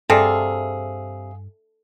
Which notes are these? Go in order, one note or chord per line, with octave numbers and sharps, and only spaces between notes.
G2 C3 G#4 A4 D5 E5 F5 A5